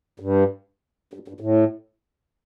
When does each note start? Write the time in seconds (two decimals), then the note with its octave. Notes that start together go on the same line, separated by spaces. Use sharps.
0.20 G2
1.13 G2
1.28 G2
1.40 A2